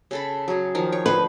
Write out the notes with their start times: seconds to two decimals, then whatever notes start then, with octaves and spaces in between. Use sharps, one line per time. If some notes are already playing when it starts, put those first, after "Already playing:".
0.11 C#3 A4 B5
0.48 F#3 G#4
0.75 D#3 F3 D#4
0.92 C#5
1.06 D3 B4 C5